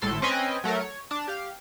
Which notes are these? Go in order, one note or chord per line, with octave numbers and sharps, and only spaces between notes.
G#1 A2 A4 C6
C4 C#4 B4 D#5 G5 G#5
F#3 A3 A4 A#4
C#5
D4 A5
G4 F5